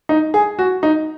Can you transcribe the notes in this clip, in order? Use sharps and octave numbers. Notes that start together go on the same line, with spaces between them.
D#4
G#4
F#4
D#4